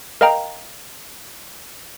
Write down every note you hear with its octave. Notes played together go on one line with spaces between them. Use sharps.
A#4 D#5 F5 G5 A#5